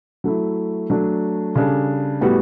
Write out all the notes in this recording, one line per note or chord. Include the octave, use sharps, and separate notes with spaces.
F#3 A3 E4
F#3 A3 D4
C#3 G3 D4 A4
A2 G3 B3 F#4